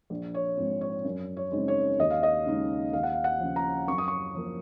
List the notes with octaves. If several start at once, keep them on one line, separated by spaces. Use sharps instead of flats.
A#1
C#5
G#2 F3 C4
C#5
F#2
C#5
C#3 G#3 C4 D#4
C#5
D#2 D#5
F5
D#5
C#3 G#3 D#4
D#2 F5
F#5
F5
F#5
C#3 F3
A#5
F#2 C#6
D#6
C#6
F3 A#3